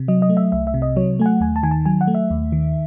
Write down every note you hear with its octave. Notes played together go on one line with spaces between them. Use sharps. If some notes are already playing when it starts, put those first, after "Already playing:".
Already playing: C3
F#3 D#5
D#5
A3
E5
C2 E5
E5
C3
D#5
F#3 C#5
A3 G#5
F#5
D#2 G#5
A5
D#3 G#5
A5
F#3 G#5
F#5
A3
E5
D#2
D#3